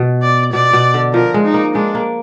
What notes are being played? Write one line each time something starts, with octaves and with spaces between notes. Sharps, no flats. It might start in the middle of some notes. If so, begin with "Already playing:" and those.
Already playing: B2
D5
B2 D5
B2
D3
F3 A#4
G#3
D#4
A#3
G#3 D4
A#3